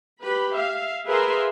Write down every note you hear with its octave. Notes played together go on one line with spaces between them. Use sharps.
G4 B4 B5
E5 F5
G#4 A#4 B4 E5 F5 C6